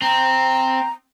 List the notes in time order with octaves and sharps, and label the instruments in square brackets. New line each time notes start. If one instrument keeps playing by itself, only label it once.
[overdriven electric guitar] C4 [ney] A#5